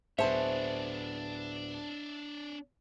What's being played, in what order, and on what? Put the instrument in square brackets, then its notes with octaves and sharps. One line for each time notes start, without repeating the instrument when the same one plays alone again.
[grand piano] D1 B3 G#4 [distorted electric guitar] D4 C#5 [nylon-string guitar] C5 A5 [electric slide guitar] E5